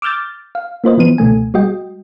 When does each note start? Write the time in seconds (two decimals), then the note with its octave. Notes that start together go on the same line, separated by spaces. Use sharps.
0.02 D6 E6 F6 G6 A6
0.55 F5
0.84 A#3 F4 C5 D#5
0.97 E3 F3 B3 D#7
1.18 C#2 B2 A3 G#5
1.54 G3 G#3 F#4 D#5 G5